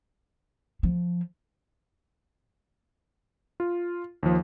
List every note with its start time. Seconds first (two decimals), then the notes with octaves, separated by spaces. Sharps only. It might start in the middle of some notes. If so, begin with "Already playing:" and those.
0.83 F3
3.60 F4
4.23 D#2 F3